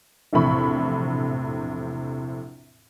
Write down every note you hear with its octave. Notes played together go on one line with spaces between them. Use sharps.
A#1 E2 A2 C3 B5 C#6